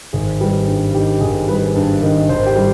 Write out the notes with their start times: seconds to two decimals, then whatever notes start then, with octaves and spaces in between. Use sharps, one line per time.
0.13 G#1 G#4
0.40 G3 B4
0.67 G2
0.94 D#3 G4
1.21 G#1 G#4
1.48 G3 B4
1.75 G2
2.03 D#3
2.29 G#1 C5
2.46 G4
2.55 G3